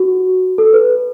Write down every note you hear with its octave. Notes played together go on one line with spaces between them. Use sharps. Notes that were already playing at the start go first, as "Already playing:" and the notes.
Already playing: F#4
A4
B4